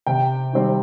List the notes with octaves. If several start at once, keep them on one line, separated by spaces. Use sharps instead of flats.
C3 G5
D#3 G3 C4